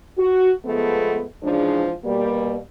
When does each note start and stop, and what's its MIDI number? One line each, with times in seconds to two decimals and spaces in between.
0.18 0.52 66
0.66 1.24 53
0.66 1.24 56
0.66 1.24 57
0.66 1.24 59
1.43 1.93 44
1.43 1.93 49
1.43 1.93 52
1.43 1.93 53
1.43 1.93 62
2.04 2.57 47
2.04 2.57 55
2.04 2.57 58